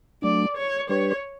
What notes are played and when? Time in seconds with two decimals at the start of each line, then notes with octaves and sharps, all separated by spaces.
0.22 F#3 A3 D4 D5
0.57 C#5
0.89 G3 D4 G4 B4 C#5